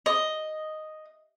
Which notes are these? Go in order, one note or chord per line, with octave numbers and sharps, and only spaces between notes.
D#5